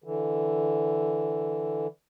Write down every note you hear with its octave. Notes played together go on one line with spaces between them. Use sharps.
D3 E3